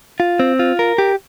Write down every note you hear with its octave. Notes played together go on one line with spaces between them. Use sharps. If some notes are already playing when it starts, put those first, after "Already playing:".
F4
C4
F4
A#4
G4